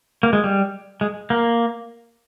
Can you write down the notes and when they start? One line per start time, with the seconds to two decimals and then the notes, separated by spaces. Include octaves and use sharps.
0.23 A#3
0.33 G#3
0.44 G3
1.01 G#3
1.30 A#3